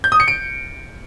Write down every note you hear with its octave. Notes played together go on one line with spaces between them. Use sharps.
G6
D#6
C#7
D7